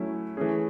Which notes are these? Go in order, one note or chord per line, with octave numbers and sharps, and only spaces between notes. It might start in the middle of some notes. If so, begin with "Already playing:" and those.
Already playing: F#3 A3 C#4 E4
E3 A3 C#4 G#4